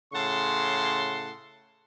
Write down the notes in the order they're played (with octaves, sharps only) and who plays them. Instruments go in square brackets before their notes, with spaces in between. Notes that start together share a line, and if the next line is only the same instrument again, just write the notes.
[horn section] A2 C#3 F#5 A5 C6